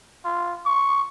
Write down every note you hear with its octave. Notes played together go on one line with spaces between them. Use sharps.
F4
C#6